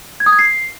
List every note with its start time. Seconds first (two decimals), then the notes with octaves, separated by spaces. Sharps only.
0.20 G#6
0.26 D#6
0.33 G#6
0.39 C7